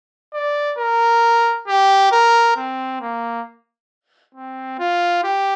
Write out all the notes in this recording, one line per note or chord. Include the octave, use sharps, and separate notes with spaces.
D5
A#4
G4
A#4
C4
A#3
C4
F4
G4